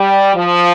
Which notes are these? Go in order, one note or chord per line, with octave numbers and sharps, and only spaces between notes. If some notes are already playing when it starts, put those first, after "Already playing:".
Already playing: G3
F3